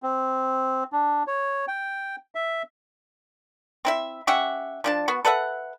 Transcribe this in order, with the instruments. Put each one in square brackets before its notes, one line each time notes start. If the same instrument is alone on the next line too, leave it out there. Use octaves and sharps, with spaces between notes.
[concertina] C4
D4
C#5
G5
E5
[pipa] C4 E4 E5
C#4 G4 E5 F#5
F3 D4 A5
B3 F#4
A4 B4 E5 F#5